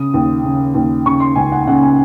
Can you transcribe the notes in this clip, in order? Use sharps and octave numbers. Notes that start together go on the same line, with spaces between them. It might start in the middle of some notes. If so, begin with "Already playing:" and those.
Already playing: C#3 D#6
D#2
C#3
D#2
C#3 C#6
C6
C#2 G#5
F#5
C#3 F#5
G#5